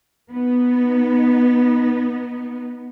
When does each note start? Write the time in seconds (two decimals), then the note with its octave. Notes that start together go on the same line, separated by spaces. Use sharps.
0.30 B3 D#4